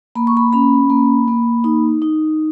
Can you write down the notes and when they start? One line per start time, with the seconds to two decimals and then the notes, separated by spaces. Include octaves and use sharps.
0.15 A#3 B5
0.27 C#6
0.37 B5
0.53 C#4 B5
0.90 A#3
1.28 A#3
1.64 D#4
2.02 D#4